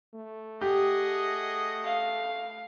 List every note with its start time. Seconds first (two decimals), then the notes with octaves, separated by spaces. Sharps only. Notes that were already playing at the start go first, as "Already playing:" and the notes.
0.15 A3
0.61 G4 G#4 D#5 F#5
1.85 F5